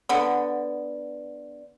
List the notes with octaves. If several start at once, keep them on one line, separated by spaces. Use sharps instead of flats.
D3 B3